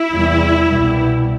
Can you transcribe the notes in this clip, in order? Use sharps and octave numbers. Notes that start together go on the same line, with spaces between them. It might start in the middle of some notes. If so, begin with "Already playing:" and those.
Already playing: E4
E2 C3 G3
C2 B2 G3 B3